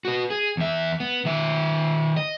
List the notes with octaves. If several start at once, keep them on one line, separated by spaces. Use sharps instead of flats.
F#4 B4
G#4
E2 E5
B3
D#3 E5
D#5